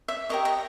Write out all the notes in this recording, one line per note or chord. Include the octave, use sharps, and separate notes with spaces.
E5
G4 A#4 C#5 D#5
D#5